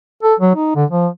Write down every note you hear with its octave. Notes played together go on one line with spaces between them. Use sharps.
A4
F#3
D#4
D3
F3